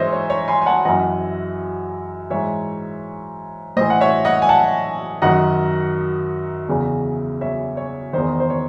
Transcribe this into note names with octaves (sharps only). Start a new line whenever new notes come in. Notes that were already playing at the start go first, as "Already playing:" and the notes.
Already playing: G#2 E3 C5 C#5 D#5 E5
C#5
C#5
G#5 C6
G#5
F#5 A5
F#2 E3 D#5 F#5
G#2 E3 C#5 E5
A2 E3 C5 D#5
F#5
C#5 E5
D#5 F#5
G#5
F#5 A5
F#2 D#3 D#5 F#5
E2 C#3 E3
C#5 E5
C#5
E2 D#3 C5
C5
C#5